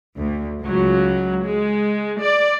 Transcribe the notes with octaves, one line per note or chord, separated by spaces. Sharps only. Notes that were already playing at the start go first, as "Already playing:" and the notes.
D2
C#2 F#3
G#3
D5